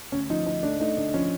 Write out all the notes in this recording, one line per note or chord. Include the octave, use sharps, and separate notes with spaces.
D2 C#4
F3 D#4
D2 D#4
A3 D4
A3 D#4
D2 D4
F3 C#4